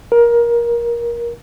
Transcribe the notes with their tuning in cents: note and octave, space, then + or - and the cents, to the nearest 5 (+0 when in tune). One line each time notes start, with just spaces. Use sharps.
A#4 +20